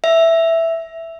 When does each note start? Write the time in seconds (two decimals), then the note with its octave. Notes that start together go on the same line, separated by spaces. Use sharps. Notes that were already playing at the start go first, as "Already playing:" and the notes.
0.04 E5